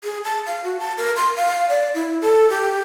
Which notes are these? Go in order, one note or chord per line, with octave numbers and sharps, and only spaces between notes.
G#4
A5
F5
F#4
A5
A#4
C6
F5
D5
E4
A4
G4